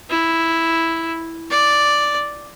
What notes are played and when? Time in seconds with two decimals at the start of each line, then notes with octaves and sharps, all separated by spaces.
0.10 E4
1.51 D5